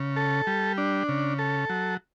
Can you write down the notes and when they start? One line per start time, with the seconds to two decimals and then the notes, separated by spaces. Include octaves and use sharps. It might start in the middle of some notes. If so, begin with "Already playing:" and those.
Already playing: C#3
0.16 A4
0.47 G3
0.78 D4
1.09 C#3
1.39 A4
1.70 F#3